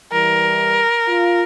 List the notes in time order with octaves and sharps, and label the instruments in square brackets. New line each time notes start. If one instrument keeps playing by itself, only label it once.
[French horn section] E3 G3 [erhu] A#4
[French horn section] F4